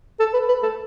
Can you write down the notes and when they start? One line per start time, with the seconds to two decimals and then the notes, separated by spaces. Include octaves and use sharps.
0.19 A4
0.33 B4
0.48 B4
0.63 A4